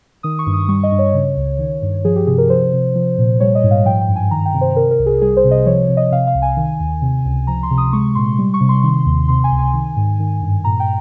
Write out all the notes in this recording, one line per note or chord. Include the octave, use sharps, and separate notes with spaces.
D#3 D#6
C#6
G2
D#6
G3 C#6
D#5
G2
C#5
C#3
C#2
D#3
G2
F3 G#4
G4
C3 G#4
A#4
F3 C5
C3
F3
A#2
G3 C#5
D#5
G#2
F5
F3 G5
G5
G2
G#5
D#3 A#5
G5
C3
C5
C3 A#4
A#4
C2
G#4
G3 G#4
C5
C3
D#5
F3 C#5
C3
D#5
C3 F5
F5
C2
G#5
D#3
D#2
C3
C#2
F3 A#5
C6
C3
D#6
G#3 C#6
A#2 C6
G3
C#6
C3
C6
D#3
D#2
C3 C6
G#5
C#2
G#5
D#3
G#2
D#3
G2
A#2 A#5
G5